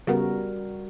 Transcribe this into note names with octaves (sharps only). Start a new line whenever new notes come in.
C#3 G3 B3 F#4 A#4